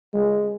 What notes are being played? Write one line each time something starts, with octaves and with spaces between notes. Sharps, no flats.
G#3